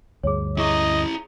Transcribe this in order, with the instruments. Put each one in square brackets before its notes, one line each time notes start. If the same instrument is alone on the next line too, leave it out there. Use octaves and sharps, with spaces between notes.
[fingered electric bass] D2 G2 [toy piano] G#4 C#5
[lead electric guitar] E4 A#5 [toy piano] G#4 C#6 [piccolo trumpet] D#5